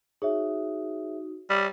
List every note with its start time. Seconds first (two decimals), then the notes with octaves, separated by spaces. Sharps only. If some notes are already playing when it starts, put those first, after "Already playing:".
0.22 D#4 F#4 G#4 C#5 E5
1.50 G3 C#5